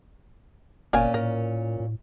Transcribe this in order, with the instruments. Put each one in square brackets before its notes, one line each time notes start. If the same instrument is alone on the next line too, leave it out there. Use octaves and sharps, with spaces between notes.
[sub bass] F#1 [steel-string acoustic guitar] A#2 C#4 [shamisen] A#4 C#5 G#5
[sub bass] A2 [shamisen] A#4
[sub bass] A2